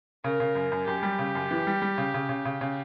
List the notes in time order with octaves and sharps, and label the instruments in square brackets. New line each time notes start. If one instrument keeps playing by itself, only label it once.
[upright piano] C#3 [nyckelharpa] A#4
[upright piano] C#3
F#2
F#2
[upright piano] F#2 [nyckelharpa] G4
[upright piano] G3
C#3
F#2
E3
G3
G3
C#3
C#3
C#3
C#3
C#3